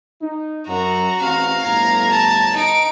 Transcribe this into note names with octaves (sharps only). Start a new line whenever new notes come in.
D#4
F#2 F#4 A#5
A1 E2 C4 F5
G1 A2 A#5 G#6
A5
D#4 D7